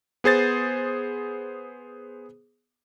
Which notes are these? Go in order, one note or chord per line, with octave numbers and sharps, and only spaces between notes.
B3 G#4 C5 A6